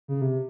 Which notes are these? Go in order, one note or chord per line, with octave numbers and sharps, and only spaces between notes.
C#3
C3